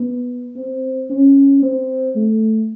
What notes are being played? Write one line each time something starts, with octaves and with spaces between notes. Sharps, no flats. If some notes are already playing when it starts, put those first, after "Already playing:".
Already playing: B3
C4
C#4
C4
A3